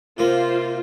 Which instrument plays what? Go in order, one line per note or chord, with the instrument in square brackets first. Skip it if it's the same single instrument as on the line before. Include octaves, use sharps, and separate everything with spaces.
[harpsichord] C3 A#3 [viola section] F4 C5